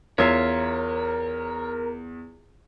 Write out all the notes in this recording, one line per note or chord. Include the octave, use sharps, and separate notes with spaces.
E2 F4 A#4 C#5 E5 F5